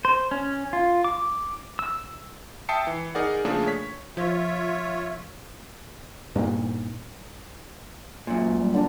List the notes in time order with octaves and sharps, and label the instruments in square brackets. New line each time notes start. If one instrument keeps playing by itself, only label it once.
[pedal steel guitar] C5
C#4
F4
D6
E6
[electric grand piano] E5 G5 A5 D#6 C7 C#7
E3
D#4 G#4 A#4 D5 F#5
C#3 F3 A3 A#3 D4 G#4
C#5 B6
[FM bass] F3 [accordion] F4 C#5 E5
[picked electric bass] G2 A#2
[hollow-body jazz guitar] F#2 A#2
[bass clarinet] D2
G3
[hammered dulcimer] D3 D4 A#5